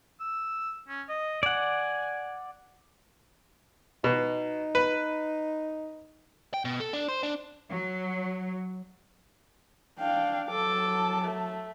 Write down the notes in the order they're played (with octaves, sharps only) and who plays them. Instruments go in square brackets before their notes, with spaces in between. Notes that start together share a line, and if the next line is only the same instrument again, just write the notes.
[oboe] E6
C#4
D#5
[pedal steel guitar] D5 F#5 [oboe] G#5
[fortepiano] B2 [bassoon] D#4
[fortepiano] B4
[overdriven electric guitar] G5
B2
A4
D4
C5
D4
[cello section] F#3
[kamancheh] D4 [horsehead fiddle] F5 G5
[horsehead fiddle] F#3 A5 [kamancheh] A4 D6
[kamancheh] A3